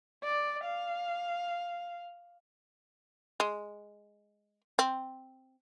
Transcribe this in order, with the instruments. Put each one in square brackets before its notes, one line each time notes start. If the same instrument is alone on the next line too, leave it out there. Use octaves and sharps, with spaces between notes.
[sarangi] D5
F5
[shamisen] G#3
C4